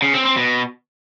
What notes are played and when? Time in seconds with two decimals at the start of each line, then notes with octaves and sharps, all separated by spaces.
0.02 C#3
0.14 C4
0.25 C4
0.36 B2